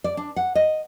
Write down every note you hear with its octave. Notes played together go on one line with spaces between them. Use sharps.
D5
D4
F#5
D#5